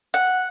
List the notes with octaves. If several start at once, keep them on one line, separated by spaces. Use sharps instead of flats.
F#5